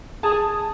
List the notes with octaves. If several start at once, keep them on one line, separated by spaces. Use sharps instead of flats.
G#4 A5